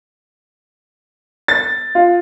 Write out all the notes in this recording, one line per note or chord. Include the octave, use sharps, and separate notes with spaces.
A6
F4